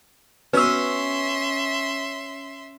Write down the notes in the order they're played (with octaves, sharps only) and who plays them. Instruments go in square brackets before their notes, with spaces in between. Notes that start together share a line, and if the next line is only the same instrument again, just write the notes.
[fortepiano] B3 F#4 [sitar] C#4 [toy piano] B4 E6 [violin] E5 C6